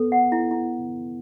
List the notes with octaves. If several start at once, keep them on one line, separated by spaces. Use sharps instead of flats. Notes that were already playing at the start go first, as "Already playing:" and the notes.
Already playing: B3 A4
F#5
E4
E4